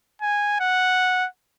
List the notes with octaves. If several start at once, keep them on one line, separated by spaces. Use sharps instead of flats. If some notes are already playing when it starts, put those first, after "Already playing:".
G#5
F#5